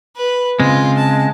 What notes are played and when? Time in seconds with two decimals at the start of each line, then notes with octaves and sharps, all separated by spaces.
0.17 B4
0.60 C#3 G#3 C4 F4
0.97 A5